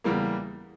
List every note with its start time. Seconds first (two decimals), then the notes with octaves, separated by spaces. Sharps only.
0.04 E2 C#3 E3 G3 A#3